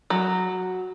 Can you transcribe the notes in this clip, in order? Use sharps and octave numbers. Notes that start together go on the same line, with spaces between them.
F#3